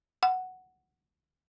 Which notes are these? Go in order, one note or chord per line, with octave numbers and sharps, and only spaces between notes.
F#5